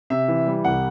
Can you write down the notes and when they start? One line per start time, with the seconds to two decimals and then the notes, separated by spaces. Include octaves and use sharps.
0.10 C3 E5
0.28 E3
0.47 G3
0.64 C2 F#5